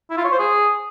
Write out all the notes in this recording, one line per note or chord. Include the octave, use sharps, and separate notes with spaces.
E4
F4
C#5
C5
G#4